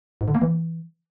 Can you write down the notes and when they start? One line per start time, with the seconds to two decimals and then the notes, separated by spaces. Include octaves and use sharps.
0.21 G#2
0.28 D3
0.35 A#3
0.41 E3